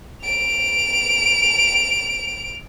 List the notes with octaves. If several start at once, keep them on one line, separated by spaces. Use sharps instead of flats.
D7 F7